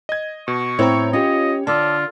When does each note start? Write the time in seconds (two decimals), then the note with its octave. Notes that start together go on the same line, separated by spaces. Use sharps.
0.09 D#5 G#6
0.48 B2 C#6
0.79 A2 B3 C4 E4 C5 C#5 G5 A#5
1.13 C#4 F4 G4 D#5
1.67 D3 F4 A5 D6 E6